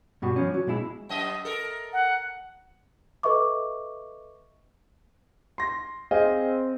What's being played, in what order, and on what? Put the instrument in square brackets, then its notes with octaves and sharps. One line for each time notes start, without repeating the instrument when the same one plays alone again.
[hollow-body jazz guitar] G2 B2 F#4
F3 C#4
F#3
B2 G#3 E4
[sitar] F#2 D#5 E5
A4 A#4
[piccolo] F#5
[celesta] A4 B4 D#5 E5 C#6 D6
[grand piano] C6 A#6
[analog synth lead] C4 [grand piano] G#4 D#5 F5